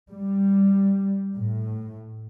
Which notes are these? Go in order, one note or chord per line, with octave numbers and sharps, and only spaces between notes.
G3
A2